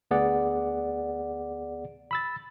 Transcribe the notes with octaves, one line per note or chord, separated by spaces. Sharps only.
D2 B3 G#4 D5 F#5
B5 E6 A6